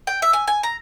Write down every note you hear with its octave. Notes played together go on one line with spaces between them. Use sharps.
G5
E5
G#5
G#5
A#5